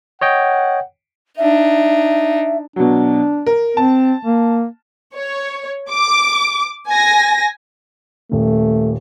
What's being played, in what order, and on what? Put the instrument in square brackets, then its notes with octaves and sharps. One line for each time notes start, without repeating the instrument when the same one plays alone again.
[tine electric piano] C#5 D#5 G5 [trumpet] F#5
[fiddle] D4 D#4 [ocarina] E5
[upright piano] B2 F#3 [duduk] D4
[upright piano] A#4
[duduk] C4 [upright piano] A5
[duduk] A#3
[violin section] C#5
D6
G#5 A#6
[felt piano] D#1 [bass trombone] A3